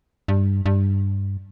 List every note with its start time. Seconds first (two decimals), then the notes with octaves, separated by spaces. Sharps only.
0.28 G2
0.66 G2